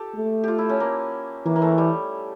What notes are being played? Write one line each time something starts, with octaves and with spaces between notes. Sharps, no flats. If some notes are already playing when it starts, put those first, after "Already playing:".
Already playing: G4 A4
A3
F4 G4
E4
C#4
A#3
E3 A#3
A#3
A3
G3